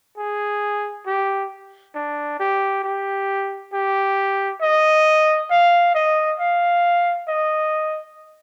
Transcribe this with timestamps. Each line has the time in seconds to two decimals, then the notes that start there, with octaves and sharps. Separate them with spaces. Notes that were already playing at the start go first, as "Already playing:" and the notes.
0.18 G#4
1.06 G4
1.95 D4
2.40 G4
2.84 G4
3.73 G4
4.61 D#5
5.51 F5
5.95 D#5
6.39 F5
7.28 D#5